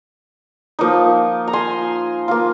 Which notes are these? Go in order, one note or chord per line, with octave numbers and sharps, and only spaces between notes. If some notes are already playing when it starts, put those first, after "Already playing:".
F3 A#3 D#4
A#5
G#5 C6
A#3 F4